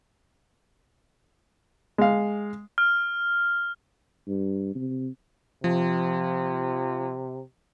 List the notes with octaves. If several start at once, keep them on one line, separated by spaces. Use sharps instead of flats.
G#3 F5
F6
G2
C3
C3 F3